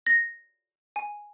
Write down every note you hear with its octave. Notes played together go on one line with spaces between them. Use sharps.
A#6
G#5